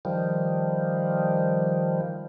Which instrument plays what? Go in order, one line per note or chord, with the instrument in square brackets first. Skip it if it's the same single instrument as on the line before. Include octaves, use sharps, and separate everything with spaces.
[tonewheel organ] D#3 F3 G3